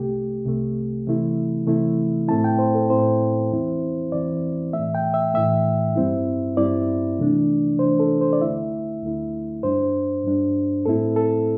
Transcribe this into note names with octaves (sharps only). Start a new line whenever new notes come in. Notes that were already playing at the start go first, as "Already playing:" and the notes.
Already playing: C2 C3 A3 G4
C2 C3 A3
C3 E3 A3 E4
C3 E3 A3 E4
A2 A3 C4 E4 A5
G5
C5
A4
A2 A3 C4 E4 C5
E2 E3 C4 E4
E2 E3 C4 E4 D5
A2 E3 A3 E5
G5
E5
A2 E3 A3 E5
G2 G3 C4 E4
G2 G3 C4 E4 D5
C3 E3 A3 D4
C3 E3 A3 D4 C5
A4
C5
D5
D2 D3 A3 E4 E5
D2 D3 A3 E4
G2 G3 D4 C5
G2 G3 D4
A2 A3 C4 E4 A4
A4